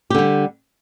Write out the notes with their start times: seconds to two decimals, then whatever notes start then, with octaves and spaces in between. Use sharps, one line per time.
0.10 G4
0.14 D3
0.18 G3